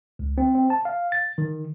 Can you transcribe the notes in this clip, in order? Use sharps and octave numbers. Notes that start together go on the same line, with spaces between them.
C#2
C4
C4
A5
F5
A6
D#3